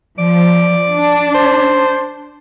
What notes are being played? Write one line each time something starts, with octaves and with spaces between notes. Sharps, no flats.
F3 D5
D4
C5